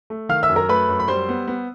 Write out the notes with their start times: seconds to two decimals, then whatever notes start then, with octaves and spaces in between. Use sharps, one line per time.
0.10 A3
0.29 D#3 F5 F6
0.43 E5 E6
0.49 F#2
0.56 A#4 A#5
0.69 A3 B4 B5
0.89 F#2
1.00 B5
1.08 G3 C5 C6
1.29 B3
1.48 B3